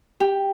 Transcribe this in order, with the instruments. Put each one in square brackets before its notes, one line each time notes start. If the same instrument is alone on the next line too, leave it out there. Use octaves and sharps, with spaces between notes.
[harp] G4